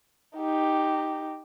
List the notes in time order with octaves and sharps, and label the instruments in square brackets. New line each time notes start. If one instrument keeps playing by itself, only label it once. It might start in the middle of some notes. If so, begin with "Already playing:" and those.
[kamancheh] D#4 G4